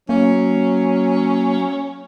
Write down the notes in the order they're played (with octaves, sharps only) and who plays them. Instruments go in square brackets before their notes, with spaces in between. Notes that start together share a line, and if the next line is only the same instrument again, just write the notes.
[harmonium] F#3 [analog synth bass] A#3 [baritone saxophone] C#4